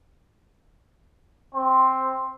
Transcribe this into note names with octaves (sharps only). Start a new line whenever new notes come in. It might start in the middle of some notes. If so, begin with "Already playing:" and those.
C4 C6